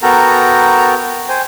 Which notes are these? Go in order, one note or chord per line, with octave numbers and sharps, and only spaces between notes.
B3 F#4 A4 A#4 G5 A#5
C5 G5 G#5